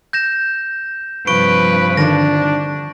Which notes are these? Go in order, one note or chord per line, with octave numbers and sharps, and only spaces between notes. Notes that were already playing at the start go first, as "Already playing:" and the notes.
G6 A#6 E7
G2 C3 F3 B4 C#6 D7
D3 D#3 D4 A#6